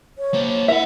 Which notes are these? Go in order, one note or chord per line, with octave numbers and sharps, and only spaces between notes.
C#5
A#3 C5
C#5
E4 A#4 E5 F#5